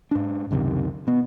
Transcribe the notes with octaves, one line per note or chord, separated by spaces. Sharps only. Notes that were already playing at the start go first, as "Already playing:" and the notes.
G#2 D4
C#2 F#2 C3 D#3
B2 B3